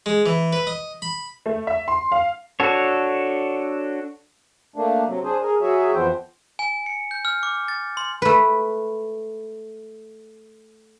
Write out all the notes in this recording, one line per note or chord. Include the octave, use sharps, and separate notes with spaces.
G#3
E3
B4
D#5
B5
A3
E5
C6
F5
D4 F#4 A4 C#5
A3 A#3 D4
C3 F#3
D4 G#4 C5
G#4 A#4
F#3 F#4 G#4 C#5 E5
F2 E3 F3 B3 C5 G5
G#5
C#7
G6
F6
D6
A6
C6
A3 B4